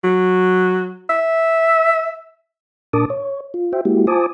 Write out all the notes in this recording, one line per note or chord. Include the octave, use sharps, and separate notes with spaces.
F#3
E5
A#2 D4 A#4 A5 D6 D#6
C#5
F4
F#4 C5 E5 G5
G#3 A#3 E4 F#4 G4
F4 C5 G#5 A5 D6 D#6